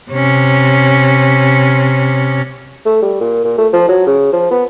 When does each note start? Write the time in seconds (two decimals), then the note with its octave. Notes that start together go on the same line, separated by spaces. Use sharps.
0.11 C3 C#4
2.86 A3
3.02 G3
3.21 A#2
3.45 A#2
3.58 A3
3.73 F3
3.88 F#3
4.07 C#3
4.33 F3
4.51 B3